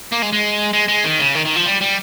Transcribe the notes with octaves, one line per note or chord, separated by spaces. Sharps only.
A#3
G#3
G#3
G#3
G#3
D#3
C#3
D#3
D#3
F3
G3
G3